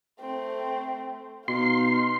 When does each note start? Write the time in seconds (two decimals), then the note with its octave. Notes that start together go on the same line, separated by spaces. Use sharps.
0.20 A3 C4
1.48 B2 D#4 F5 C6